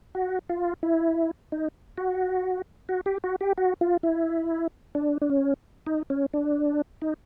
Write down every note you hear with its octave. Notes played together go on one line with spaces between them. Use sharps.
F#4
F4
E4
D#4
F#4
F#4
G4
F#4
G4
F#4
F4
E4
D4
D4
C#4
D#4
C#4
D4
D#4